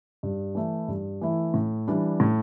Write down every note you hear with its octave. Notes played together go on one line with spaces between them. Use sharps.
G2
E3 A3 E4
G2
E3 A3 E4
A2
E3 G3 D4
A2